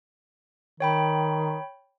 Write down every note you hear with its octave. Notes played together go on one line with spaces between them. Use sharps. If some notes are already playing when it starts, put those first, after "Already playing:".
D#3 C#5 G5 B5